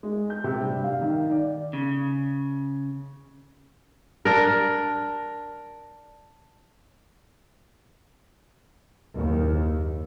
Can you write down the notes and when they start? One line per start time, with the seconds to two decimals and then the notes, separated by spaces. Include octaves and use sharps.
0.03 G#3
0.30 G6
0.44 C3
0.61 G2
0.84 F5
1.02 D#3
1.30 D5
1.73 C#3
4.25 D4 A#4
9.15 F#1 D#2